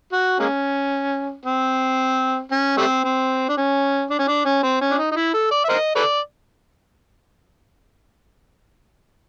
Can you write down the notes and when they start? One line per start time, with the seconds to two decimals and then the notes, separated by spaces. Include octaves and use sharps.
0.13 F#4
0.39 G#3 A#3 C#4
1.45 C4
2.51 C#4
2.77 G3 A3 C4
3.05 C4
3.49 D4
3.57 C#4
4.10 D4
4.19 C#4
4.28 D4
4.45 C#4
4.63 C4
4.81 C#4
4.91 D4
4.98 D#4
5.12 D#4
5.16 E4
5.34 A4
5.51 D5
5.64 E5
5.69 A#4 C5 D#5
5.96 A4 B4 D5